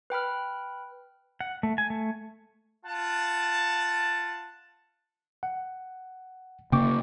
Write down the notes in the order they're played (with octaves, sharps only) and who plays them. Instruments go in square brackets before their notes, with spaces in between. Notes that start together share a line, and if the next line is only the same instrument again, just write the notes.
[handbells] B4 G5 B5 F6
[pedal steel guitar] F#5
A3
G#5
A3
[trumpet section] F4 F#5 A5
[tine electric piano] F#5
[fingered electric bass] C#3 A#3 C#4 [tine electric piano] G5 C#6 D6